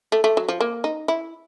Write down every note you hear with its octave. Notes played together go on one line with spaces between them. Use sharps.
A3
A3
F#3
F3
A#3
D#4
E4